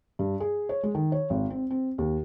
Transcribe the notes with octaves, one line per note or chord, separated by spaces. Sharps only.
G2
G#4
C#5
G#3
D#3
C#5
G#1
C4
C4
D#2